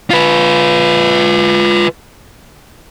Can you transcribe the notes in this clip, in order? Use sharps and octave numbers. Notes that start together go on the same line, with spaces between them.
F4 B4